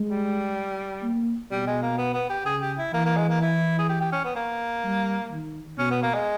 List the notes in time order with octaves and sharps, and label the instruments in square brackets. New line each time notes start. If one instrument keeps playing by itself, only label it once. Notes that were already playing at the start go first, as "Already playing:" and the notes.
Already playing: [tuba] G#3
[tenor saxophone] G3
[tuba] A#3
[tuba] B2 [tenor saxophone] G3
[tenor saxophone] G#3
A#3
B3
B3
G4
[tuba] C#3 [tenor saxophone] G#4
[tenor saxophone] G4
E4
[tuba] E3 [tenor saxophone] A#3
[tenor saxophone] A#3
G#3
A#3
E4
G#4
G4
G4
C#4
B3
A#3
[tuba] G3
D#3
[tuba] B2 [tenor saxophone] C#4
[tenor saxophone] B3
A#3
G#3